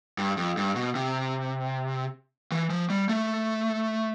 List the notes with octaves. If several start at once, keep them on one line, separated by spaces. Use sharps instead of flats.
G2
F2
G2
B2
C3
E3
F3
G3
A3